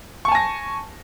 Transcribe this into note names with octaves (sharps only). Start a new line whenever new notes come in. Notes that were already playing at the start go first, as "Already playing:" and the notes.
G#5 A5 C#6 A#6